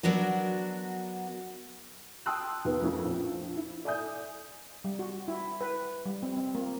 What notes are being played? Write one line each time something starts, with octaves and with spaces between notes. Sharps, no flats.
F#3 B3 D4 F#4 A#4
G5 A5 C6 D#6 E6 F#6
D#2 B3 B4
F2 A3 A#3 C#4 E4
A#1 F3
E4
A4 D5 E5 G#5 D#6 G6
G3
F#4
E4
B4
G3
C4
C4
A#3